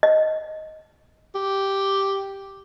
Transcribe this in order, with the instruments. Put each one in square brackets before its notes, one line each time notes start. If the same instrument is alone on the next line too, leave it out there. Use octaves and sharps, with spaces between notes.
[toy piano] D#5
[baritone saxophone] G4